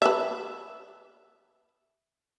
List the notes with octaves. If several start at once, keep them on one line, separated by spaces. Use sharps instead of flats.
B4 E5